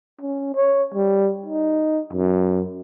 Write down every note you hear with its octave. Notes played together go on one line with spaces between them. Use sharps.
C#4
C#5
G3
D#4
F#2